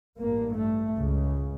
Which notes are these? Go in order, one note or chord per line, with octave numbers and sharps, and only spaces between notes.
A1 G2 A#3
A3
C#2 C#3